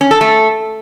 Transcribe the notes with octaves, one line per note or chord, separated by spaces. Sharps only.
C#4
A4
A3